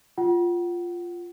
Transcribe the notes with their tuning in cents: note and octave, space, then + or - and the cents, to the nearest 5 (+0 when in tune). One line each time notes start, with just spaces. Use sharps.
F4 +0 F#5 +30